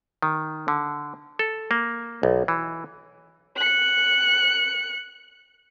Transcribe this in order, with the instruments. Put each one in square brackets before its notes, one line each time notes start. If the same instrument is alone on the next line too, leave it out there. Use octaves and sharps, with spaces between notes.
[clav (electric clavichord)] D#3
D3
A4
A#3
B1
E3
[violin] F#6 C#7